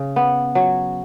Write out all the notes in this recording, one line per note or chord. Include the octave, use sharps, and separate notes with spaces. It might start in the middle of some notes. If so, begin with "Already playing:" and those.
Already playing: C#3
B3
F#3